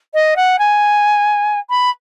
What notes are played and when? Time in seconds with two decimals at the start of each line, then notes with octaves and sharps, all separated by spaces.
0.14 D#5
0.36 F#5
0.59 G#5
1.70 B5